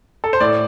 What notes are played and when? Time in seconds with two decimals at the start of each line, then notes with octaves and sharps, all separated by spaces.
0.24 A4
0.33 C5
0.40 A2 D5